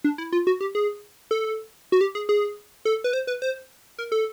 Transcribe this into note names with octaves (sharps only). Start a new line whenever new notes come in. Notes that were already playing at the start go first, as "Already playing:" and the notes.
D4
E4
F4
F#4
G4
G#4
A4
F#4
G4
G#4
G#4
A4
B4
C5
B4
C5
A#4
A4